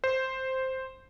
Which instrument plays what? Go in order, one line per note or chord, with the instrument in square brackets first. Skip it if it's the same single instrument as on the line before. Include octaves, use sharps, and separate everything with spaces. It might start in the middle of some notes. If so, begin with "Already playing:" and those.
[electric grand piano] C5